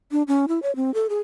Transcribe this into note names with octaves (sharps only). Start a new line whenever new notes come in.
D4
C#4
E4
C#5
C4
A4
G#4